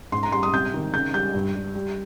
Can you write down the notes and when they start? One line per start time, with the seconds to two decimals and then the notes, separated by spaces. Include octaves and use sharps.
0.12 G#2 C6
0.23 A#5
0.32 G3 C6
0.43 D#6
0.53 C3 G6
0.74 D#3
0.93 C#3 G6
1.13 G3 G6
1.35 G2
1.55 G3
1.75 G3